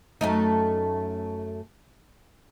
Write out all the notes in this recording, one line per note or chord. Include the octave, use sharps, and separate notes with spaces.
F#2 A3 D#4